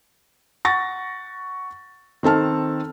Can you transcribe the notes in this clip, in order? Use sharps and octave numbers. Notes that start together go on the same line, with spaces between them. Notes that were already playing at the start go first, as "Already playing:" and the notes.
F#5 C#6 A6 A#6
D#3 C4 A4 A5 F6